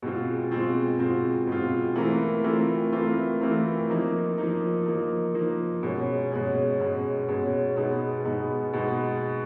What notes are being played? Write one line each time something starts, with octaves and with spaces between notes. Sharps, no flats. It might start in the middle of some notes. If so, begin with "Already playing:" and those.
B2 G#3 C4 F4
B2 G#3 C4 F4
B2 G#3 C4 F4
B2 G#3 C4 F4
E3 A3 C4 F4 A#4
E3 A3 C4 F4 A#4
E3 A3 C4 F4 A#4
E3 A3 C4 F4 A#4
F3 A#3 D#4
F3 A#3 D#4
F3 A#3 D#4
F3 A#3 D#4
B2 G#3 C#4
B2 G#3 C#4
B2 G#3 C#4
B2 G#3 C#4
B2 G#3 B3 D#4
B2 G#3 B3 D#4
B2 G#3 B3 D#4